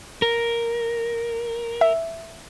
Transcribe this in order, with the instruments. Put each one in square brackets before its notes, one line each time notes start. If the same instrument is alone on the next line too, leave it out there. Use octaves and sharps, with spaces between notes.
[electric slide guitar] A#4
[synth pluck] E5